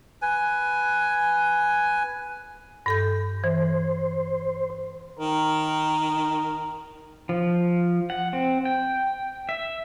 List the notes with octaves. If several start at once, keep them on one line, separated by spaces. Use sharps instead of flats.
B4 G#5
G2 A4 G6
E3 C5
D#3 A#4
F3
F#5
C4
G5
E5